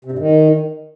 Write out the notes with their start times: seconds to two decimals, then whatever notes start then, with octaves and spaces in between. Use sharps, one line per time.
0.05 C3
0.12 G2
0.19 D#3